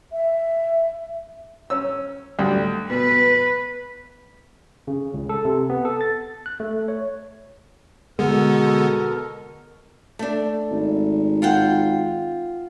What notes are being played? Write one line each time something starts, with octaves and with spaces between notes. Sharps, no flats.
E5
C#4 E6
D2 G3 G5
B2 B4
C#3
C#2
A4
C3
B3
A4
A6
F#6
A3
C#5
B2 D3 G#3 B3 A4 A#4
A3 D4
G#1
F4 F#5 G5